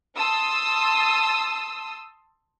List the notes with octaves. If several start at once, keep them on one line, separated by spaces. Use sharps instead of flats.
A5 C6 D#6 E6